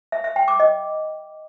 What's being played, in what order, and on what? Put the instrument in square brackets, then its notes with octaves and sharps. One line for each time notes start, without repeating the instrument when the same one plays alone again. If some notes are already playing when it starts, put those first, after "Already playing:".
[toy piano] E5
E5
G5
D6
D#5